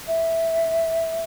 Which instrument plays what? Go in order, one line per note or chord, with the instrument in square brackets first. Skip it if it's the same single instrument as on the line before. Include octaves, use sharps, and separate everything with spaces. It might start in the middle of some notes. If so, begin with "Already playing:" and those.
[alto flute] E5